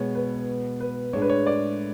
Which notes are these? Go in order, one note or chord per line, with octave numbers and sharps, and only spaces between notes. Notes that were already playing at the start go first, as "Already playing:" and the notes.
Already playing: B2 G#3 B3 C#5
B4
B4
A2 G#3 D4 C#5
B4
C#5
D5